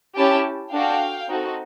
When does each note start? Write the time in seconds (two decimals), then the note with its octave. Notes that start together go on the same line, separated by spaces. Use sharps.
0.16 C#4 E4 G4 G5 A5
0.72 D4 F#4 A4 F5 G5
1.28 C4 D#4 F#4 A4